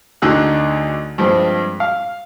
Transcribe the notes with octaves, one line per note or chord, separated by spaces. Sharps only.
D2 D3 D#4 G#4 E6 F#6
G2 F3 G#3 C4
F5